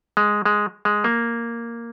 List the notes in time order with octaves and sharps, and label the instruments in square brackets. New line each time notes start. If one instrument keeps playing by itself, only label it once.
[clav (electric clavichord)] G#3
G#3
G#3
A#3